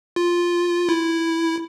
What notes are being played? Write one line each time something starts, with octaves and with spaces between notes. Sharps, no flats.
F4
E4